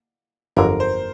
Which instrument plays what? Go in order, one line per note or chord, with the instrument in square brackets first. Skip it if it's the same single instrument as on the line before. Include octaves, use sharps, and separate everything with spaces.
[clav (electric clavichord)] G1 F2 D3 F#3 [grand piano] A#4
[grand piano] C5